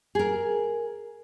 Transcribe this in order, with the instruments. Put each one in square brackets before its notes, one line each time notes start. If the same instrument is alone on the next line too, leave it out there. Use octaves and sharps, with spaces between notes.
[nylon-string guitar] G#4 A#4